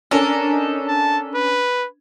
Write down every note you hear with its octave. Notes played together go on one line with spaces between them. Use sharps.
C#4 D4 A4 A#4
D#4
A5
B4